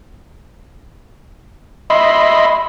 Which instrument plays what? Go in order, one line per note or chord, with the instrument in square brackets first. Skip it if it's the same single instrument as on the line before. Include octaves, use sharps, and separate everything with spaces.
[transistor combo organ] D#5 E5 B5 C6